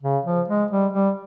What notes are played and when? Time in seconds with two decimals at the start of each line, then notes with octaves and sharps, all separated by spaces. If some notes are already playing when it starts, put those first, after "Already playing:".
0.03 C#3
0.25 F3
0.48 G#3
0.71 G3
0.93 G3